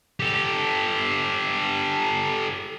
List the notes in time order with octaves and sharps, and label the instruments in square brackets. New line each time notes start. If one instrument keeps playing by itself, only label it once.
[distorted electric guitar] G4 A4